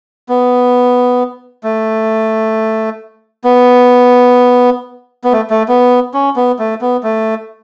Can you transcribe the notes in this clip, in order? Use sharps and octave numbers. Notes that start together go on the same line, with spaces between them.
B3
A3
B3
B3
A3
A3
B3
C#4
B3
A3
B3
A3